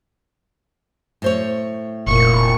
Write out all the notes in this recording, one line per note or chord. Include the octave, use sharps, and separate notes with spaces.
A2 C5 C#5
F1 A#2 C#6